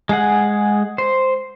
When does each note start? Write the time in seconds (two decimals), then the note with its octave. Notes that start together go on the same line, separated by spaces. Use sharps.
0.09 G#3 G#4 F#5
0.98 C5